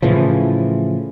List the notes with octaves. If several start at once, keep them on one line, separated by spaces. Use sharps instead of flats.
A2 C#3 E3 F3